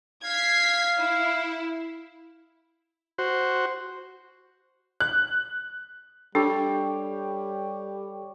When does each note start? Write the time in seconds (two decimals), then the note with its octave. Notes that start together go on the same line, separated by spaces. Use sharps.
0.24 F5 G#6 B6 C7
0.97 E4
3.18 F#4 C5
5.00 F#6
6.35 G3 D4 G4 A4 C#5